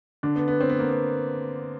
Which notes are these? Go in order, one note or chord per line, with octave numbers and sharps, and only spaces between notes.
D3 D4
B3
B3
C4
B3
A#3
B3